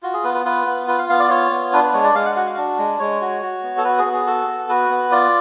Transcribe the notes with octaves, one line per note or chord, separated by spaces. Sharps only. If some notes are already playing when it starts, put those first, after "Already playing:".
F4 F#4
G#4
B3 B4
B4
F4 B4
B3
F4 B4
F5
B3 F5
D5
F4 C#5
B3
D4 B4
B4
G#3 C#5
D5
G#3 F5
F#5
F#4 F#5
F5
D4
G#3
G#3 C#5
F#4
F#4
B3
A4
F#4 B4
G#4
B3
G#4
F#4 A4
B3
F#4 B4
B3
F4 D5